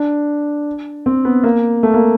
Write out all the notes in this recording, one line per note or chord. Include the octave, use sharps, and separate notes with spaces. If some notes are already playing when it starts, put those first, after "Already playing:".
Already playing: D4
C4
B3
A#3
A3
A#3